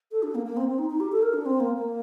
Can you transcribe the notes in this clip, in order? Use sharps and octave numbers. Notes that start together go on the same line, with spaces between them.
A4
D4
A#3
A#3
C4
C4
D#4
D#4
G4
A4
A#4
D4
C4
A#3
A#3